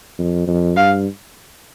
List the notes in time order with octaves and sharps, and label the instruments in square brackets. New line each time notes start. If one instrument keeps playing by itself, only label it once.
[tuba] F2
F2
[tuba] G2 [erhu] F5